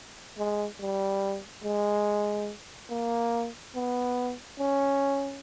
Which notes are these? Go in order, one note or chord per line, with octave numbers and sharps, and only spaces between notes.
G#3
G3
G#3
A#3
B3
C#4